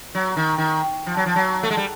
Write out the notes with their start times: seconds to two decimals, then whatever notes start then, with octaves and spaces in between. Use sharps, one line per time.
0.15 F#3
0.36 D#3
0.58 D#3
1.06 F3
1.17 F#3
1.26 F3
1.36 F#3
1.63 A3
1.70 G#3
1.77 G3